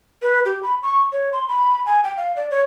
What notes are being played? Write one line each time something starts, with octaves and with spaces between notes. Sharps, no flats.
B4
G4
B5
C#6
C#5
C6
B5
G#5
G5
F5
D5
C#5